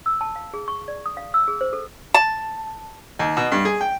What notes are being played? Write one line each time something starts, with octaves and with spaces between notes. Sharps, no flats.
E6
A5
F5
G#4
C#6
D5
D#6
F5
E6
G#4
C5
A4
A5
D#2
B2
G2
G#4
G5